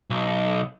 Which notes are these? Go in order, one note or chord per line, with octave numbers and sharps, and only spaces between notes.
B1